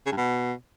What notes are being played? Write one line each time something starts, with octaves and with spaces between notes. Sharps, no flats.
C#3
G2
B2